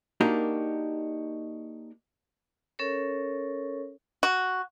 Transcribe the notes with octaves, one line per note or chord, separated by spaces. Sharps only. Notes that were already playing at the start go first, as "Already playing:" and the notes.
A#3 D4 D#4 F#4 G4 A#4
C#4 A4 A#4 C#5
F#4